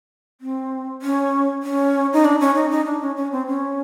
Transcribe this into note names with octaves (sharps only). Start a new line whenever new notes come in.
C4
C#4
C#4
D#4
D4
C#4
D#4
D#4
D4
C#4
C#4
C4
C#4